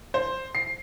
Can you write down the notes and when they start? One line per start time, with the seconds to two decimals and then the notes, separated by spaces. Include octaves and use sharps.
0.14 C5
0.55 C7